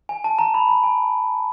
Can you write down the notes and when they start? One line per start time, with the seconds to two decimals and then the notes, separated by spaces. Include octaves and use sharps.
0.09 G#5
0.24 A5
0.39 A#5
0.54 B5
0.69 A#5
0.83 G#5